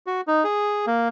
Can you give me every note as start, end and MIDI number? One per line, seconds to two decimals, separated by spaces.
0.07 0.21 66
0.27 0.44 63
0.44 0.86 68
0.87 1.08 58